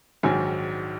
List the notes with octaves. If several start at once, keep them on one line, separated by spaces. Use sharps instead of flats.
A#1 G#2 D#3 F#3 G#5